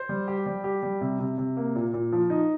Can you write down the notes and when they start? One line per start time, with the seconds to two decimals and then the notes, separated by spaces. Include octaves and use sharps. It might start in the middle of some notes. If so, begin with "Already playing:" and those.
Already playing: C5
0.09 G3
0.28 G4
0.46 G3
0.64 G4
0.83 G3
1.01 C3
1.20 C3
1.38 C3
1.57 A#3
1.75 A#2
1.94 A#2
2.12 F3
2.30 D#4